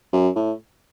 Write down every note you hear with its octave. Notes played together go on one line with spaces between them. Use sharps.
F#2
A2